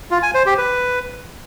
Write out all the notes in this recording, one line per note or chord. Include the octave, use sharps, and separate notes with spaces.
F4
G#5
C5
G4
B4